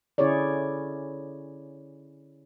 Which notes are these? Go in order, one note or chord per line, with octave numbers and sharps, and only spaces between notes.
D3 C#4 E4 G#4 C#5 D5